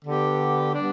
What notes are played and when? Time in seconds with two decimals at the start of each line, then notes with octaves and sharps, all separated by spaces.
0.03 D3 B3 G4
0.74 G3 B3 D4